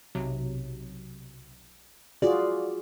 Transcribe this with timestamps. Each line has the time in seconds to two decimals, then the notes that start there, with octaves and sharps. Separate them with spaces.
0.15 B1 C3 F#3
2.22 F4 F#4 G#4 D5